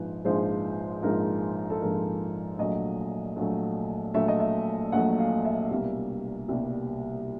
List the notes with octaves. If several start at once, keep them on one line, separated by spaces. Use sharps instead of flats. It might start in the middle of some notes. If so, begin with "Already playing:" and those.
Already playing: A#1 G#2 F3 B4
A#1 G#2 F3 G#3 C5
A#1 G#2 F3 G#3 A#4
A4
A#1 G#2 F3 G#3 A#4
A#1 A#2 F#3 A3 D#5
A#1 A#2 F#3 A3
A#1 A#2 F#3 A3 E5
D#5
E5
A#1 A#2 F#3 A3 F#5
F5
E5
C2 B2 G3 A#3
C2 B2 G3 A#3